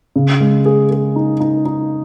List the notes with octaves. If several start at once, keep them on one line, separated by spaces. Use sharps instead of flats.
C#3
G#3
G#4
G#4
D#4
D#4
D#4